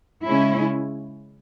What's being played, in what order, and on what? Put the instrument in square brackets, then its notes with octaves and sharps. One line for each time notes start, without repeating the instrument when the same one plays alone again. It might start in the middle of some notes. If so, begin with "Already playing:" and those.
[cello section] C#3 G#3 C#4 E4